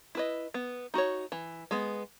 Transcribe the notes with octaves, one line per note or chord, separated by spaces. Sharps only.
E4 B4 D#5
B3
D#4 F#4 C#5
E3
G#3 B3